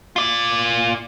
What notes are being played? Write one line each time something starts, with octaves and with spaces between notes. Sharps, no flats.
F4 D5